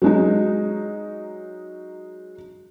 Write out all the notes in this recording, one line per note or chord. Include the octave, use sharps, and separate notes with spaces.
F#3 G#3 D#4